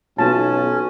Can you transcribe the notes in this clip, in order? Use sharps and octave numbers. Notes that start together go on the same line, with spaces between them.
B1 B3 C#4 F4 A5